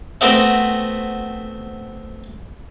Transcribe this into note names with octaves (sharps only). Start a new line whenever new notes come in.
A3 B3 C4 F#4 A#4 C5